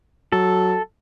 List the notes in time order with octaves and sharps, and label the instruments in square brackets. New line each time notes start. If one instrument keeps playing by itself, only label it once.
[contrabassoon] F#3 [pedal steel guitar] A4